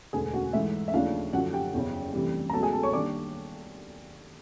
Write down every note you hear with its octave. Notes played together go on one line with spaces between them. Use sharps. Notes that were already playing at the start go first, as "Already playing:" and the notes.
E1 D2 D3 G#4 G#5
F#4 F#5
G#2 E3 A3 E5
E5
D#2 C#3 F3 A3 D4 F5
F#2 D3 F3 F#4 F#5
G4 G5
F#1 E2 C#3
D2 C3 E3 G3
A#5
C#2 B2 F#3 A3 A4 A5
G#4 G#5
A4 A5
C#5 C#6
D#3 G3 A#3 D4 D5 D6